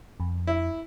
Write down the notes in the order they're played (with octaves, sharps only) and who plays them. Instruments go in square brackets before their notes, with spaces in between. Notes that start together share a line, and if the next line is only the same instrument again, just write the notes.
[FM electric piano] F2
[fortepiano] E4